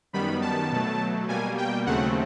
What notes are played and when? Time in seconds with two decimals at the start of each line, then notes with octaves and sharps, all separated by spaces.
0.13 F#2 D#3 G3 B3 B5
0.42 A5
0.71 B2 F#3 A3
1.28 B2 G3 A#3 G#5
1.58 G5
1.86 D#2 C#3 F#3 A3 C4 F#5